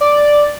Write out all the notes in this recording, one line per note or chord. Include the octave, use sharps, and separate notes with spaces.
D5